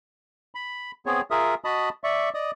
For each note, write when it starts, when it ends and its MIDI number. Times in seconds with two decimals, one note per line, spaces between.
0.55 0.91 83
1.06 1.21 59
1.06 1.21 60
1.06 1.21 68
1.06 1.21 73
1.31 1.55 65
1.31 1.55 68
1.31 1.55 70
1.31 1.55 76
1.31 1.55 87
1.64 1.89 66
1.64 1.89 75
1.64 1.89 81
1.64 1.89 83
1.64 1.89 87
2.04 2.30 74
2.04 2.30 76
2.04 2.30 85
2.34 2.51 74
2.34 2.51 75
2.34 2.51 87